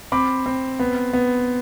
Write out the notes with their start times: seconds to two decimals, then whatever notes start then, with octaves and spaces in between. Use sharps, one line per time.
0.12 C4 B5 D6
0.46 C4
0.79 B3
1.13 B3